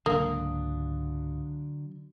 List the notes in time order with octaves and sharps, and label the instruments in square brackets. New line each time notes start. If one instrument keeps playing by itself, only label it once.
[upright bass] C#2 G#2 [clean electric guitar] D3 F#3 D4 [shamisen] A#3 [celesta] F5 D#6